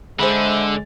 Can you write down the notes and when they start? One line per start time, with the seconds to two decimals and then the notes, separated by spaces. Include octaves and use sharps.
0.19 D3 G#3 C5 E5 B5